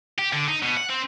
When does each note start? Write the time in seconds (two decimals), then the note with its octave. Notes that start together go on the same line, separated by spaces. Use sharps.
0.18 G4
0.33 D3
0.48 D#4
0.63 B2
0.77 F#5
0.90 C4